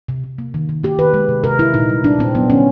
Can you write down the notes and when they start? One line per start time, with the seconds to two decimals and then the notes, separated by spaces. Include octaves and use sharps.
0.08 C3
0.24 C3
0.38 A#3
0.54 D#3
0.69 D#3
0.84 A#3 G4
0.99 D#3 B4
1.14 G#3
1.29 C3
1.44 C3 A#4
1.59 D#3 E4
1.74 A#2 D#4
1.89 G3
2.04 G3 D4
2.19 A#2 C4
2.35 F#3 B3
2.50 D3 C#4